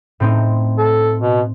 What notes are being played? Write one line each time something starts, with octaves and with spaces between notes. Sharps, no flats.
A2 C4 D#4
A4
B2